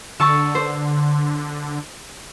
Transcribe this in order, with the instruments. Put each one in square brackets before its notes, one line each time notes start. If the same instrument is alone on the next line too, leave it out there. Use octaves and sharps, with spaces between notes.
[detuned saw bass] D3 [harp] A5 C#6 E6
[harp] C5